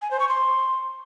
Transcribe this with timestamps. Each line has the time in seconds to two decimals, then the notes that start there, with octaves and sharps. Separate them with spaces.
0.02 G#5
0.11 C5
0.20 C#6
0.29 C6